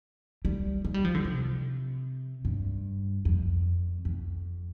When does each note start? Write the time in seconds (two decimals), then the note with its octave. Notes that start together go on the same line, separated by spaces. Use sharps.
0.45 G3
0.85 G#3
0.94 G3
1.05 F3
1.15 D3
1.25 C3
2.45 G2
3.25 F2
4.05 F2